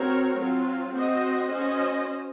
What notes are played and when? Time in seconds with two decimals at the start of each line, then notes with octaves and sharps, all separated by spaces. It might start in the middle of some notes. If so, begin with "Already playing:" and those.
Already playing: C4 F#4 A#4 C#5
0.36 F#3 C4 F4
0.93 C4 F#4 C5 D#5
1.50 C#4 F#4 C5 D#5